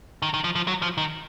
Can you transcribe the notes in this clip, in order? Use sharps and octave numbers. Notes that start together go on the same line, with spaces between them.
D#3
D#3
F3
F3
F#3
F3
D#3